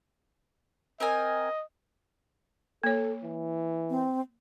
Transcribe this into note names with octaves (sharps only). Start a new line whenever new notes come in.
C4 A#4 D#5 G#5
A#3 A4 C#5
E3
C4